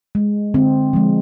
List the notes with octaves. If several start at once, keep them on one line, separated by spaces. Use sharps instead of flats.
G#3
D3 C4
F3 G#3